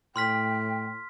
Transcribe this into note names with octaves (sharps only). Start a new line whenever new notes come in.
A2 G5 C6 F6 B6